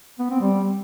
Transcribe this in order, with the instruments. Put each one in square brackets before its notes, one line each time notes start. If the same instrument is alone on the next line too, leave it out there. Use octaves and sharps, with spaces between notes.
[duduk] B3
C4
G3